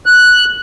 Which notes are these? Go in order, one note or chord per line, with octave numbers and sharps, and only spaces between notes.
F#6